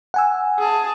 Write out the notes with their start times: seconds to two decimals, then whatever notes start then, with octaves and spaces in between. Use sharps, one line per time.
0.14 F#5 G#5 E6
0.59 G#4 A5